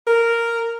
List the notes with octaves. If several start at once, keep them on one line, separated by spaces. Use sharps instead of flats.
A#4